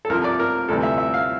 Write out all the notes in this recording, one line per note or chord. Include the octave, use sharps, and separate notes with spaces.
A4
C2 C3 F3 A#4
D5
A#4
D2 C3 E3 G3 A4
E5
E5
F5